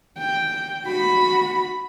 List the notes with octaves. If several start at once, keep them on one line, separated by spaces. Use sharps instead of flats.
G5
F#4 B5